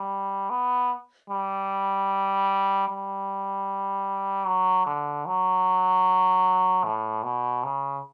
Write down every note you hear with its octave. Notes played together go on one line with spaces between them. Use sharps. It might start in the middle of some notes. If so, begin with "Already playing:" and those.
Already playing: G3
B3
G3
G3
F#3
D3
F#3
A2
B2
C#3